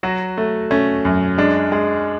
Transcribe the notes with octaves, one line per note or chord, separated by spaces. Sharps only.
F#3 F#4
A3
A3 C#4
F#2
G#3 D4
G#3